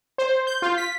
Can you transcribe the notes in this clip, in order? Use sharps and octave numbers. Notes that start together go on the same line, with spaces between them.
C5
G6
F4
B6